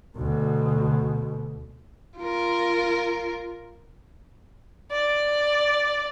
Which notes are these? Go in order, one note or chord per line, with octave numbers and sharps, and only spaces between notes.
D2 B2
F4 A#4
D5